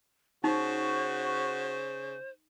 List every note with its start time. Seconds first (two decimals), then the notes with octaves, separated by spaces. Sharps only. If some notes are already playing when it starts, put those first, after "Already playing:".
0.44 C#3 D#4 F#4 C5